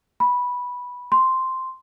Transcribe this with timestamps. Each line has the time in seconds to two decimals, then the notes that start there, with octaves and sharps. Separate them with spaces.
0.20 B5
1.12 C6